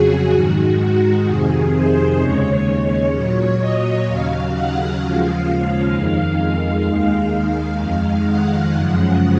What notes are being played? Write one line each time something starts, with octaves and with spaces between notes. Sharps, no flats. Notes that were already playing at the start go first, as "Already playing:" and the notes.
Already playing: F2 C#3 F#3 F#4 G#4
G#2 D#3 G#3 F#4
F#4
F2 C3 D#3 G#4
C5
D#2 C#3 G#3 C#5
A#2 F#3 C#5
D#5
D#2 C#3 F#3 F5
F#5
D#2 C#3 F3 G#3 F5
F2 D#3 G#3 F5
F5
D#2 D#3 G#3
F2 D#3 G#3
F#5
F#2 C#3 F3 G#3